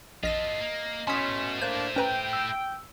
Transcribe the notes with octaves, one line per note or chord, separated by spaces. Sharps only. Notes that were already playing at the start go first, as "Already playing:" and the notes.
A#1 F4 A4 D#5 A#6 D#7
A#3
B2 A3 C#4 E4 G#5 C6 D#6 B6
A#3 D4 C5 F#6 G6
C#4 B4 G5 A#5
E6